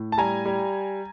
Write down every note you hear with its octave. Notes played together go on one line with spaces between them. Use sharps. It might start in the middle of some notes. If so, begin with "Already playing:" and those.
Already playing: A2
A5
G3 G#5 A#5
G3